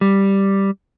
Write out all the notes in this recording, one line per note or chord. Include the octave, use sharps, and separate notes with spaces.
G3